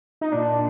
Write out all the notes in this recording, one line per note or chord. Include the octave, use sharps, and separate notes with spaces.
D#4
A#2 D4